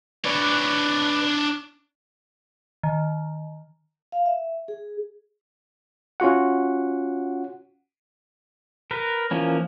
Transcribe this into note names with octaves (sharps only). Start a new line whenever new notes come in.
D4 B4 C#5 D5
D#3
F5
E5
G#4
C#4 F4 F#4 F#5
A#4 B4
E3 F3 A#3 C#4